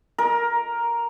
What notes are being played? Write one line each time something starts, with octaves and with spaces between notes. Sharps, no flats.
A#4